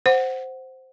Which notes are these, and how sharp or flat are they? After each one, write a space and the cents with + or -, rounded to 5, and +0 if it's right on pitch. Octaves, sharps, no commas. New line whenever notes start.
C5 +0 F#5 +0